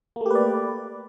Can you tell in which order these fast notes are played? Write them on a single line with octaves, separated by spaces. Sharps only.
A#3 A3 G4 B4 D5